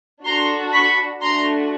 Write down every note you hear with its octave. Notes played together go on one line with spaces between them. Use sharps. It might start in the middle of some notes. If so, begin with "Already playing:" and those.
D4 F#4 A4 A#5 C6
B5 C#6
A3 D4 F#4 A#5 C6